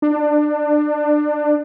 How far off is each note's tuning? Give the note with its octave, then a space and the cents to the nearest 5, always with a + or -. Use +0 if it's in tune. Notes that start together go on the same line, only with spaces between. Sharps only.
D4 +25